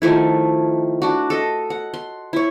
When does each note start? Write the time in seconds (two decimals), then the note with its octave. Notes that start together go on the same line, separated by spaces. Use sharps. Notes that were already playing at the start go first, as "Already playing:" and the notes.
0.02 D#3 F3 A3 E4
1.02 D4 F#4
1.30 A4 D#5
1.70 F#5
1.94 C6
2.33 E4 C#5